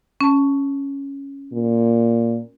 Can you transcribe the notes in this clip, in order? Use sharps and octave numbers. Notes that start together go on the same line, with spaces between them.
C#4 A5
A#2